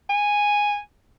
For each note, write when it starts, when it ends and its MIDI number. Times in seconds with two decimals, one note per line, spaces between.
0.10 0.79 80